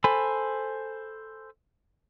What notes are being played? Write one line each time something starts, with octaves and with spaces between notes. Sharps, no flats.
A4 C5 G#5 B5